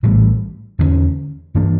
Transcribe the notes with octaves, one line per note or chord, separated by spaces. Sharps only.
A#1 A2 E3 G3
E2 D3 A3 C#4
G2 E3 A#3 D4